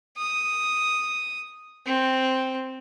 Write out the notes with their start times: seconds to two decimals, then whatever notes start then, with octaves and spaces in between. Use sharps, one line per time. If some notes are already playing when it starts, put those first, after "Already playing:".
0.17 D#6
1.86 C4